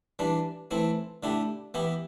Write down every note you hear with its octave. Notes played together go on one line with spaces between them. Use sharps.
E3 G3 D4
E3 A3 C4 E4
D3 A3 E4 G4
E3 B3 E4 G4